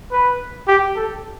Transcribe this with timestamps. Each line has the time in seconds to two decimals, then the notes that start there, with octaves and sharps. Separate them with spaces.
0.11 B4
0.68 G4
0.96 A4